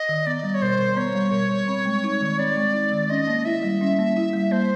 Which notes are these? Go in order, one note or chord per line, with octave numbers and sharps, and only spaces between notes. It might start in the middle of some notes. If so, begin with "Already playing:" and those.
Already playing: D#5
D#3
B3 D5
G3
C#5
B2 C5
B2
B3 C#5
G3
B2
B2
C4
G#3
D#4
D#3
C4 D5
G#3
D#4
D#3
C#4 D#5
A#3
E4 E5
G3
C#4
A#3
E4
G3
A#3 C5